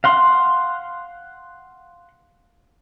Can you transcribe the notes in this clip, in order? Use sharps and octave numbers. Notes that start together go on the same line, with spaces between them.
F5 F#5 C6